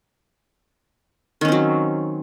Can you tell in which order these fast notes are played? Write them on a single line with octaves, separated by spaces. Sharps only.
D#3 C#4 C4 F#3